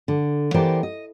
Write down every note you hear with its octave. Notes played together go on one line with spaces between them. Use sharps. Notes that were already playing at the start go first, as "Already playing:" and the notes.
D3
E3 B3 G4 A#4 C5 D5
D#5